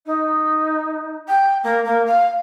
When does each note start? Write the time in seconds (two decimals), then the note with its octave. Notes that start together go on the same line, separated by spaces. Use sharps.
0.06 D#4
1.27 G5
1.63 A#3
1.84 A#3
2.06 F5